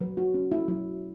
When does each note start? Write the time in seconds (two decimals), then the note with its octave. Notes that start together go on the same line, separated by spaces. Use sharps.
0.01 F#3 B4
0.17 F#4
0.34 C#4
0.52 E4
0.68 F#3 E4